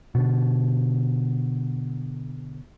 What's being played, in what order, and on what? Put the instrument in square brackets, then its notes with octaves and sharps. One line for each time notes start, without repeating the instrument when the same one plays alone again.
[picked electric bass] B2 D3